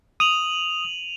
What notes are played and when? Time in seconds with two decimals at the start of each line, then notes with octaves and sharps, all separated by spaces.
0.20 D#6 D#7 F7 F#7